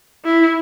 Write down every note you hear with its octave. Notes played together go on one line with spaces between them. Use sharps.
E4